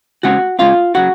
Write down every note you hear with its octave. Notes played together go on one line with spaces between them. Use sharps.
C#3 G#3 C4 F#4 F#5
C#3 G#3 C4 F4 F5
C#3 F#3 F#4 F#5